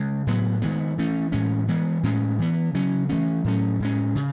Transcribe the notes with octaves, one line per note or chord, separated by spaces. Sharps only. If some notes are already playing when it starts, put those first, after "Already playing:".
Already playing: C#3 G#3
A2 F#3 B3
D#3 G#3 B3
E3 A3 C#4
A2 E3 G#3 C#4
E3 G#3 B3
A2 G#3 C#4
E3 B3
C#3 F#3 C#4
E3 A3 C#4
A2 F#3 A3 C#4
A2 G#3 C#4
C#3